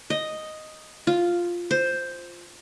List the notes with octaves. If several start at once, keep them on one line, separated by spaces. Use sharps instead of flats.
D#5
F4
C5